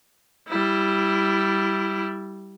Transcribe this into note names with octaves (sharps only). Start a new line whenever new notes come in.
G3 E4